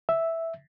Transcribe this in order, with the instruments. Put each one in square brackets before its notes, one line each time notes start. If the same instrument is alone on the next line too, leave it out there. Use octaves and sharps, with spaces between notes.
[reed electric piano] E5